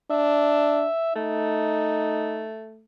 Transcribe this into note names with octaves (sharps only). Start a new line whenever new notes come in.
D4 E5
A3 D#4